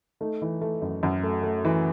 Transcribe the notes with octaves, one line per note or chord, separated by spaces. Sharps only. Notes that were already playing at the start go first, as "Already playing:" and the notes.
A3 D#4
E3
A3
F#2
F#2
A3
A3
E3